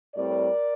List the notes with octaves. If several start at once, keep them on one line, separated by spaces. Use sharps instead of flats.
A2 G3 C4 A#4 D5